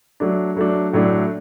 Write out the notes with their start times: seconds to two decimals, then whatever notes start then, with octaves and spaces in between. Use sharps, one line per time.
0.20 F#3 A3 D4
0.56 F#3 A3 D4
0.93 A2 F#3 A3 D4